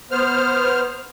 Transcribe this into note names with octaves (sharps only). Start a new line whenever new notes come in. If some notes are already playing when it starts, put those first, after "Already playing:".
B3 C5 F6